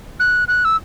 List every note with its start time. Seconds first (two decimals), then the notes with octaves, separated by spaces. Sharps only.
0.20 F#6
0.48 F#6
0.65 E6